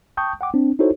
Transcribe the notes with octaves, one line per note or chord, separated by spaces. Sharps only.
G5 A5 C#6 D#6 G6
F#5 G5 D6
C4 D4
D#4 E4 F#4 A4 C5 C#5